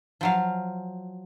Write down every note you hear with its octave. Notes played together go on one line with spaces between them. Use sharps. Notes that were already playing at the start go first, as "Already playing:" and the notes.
F3 F#3 F5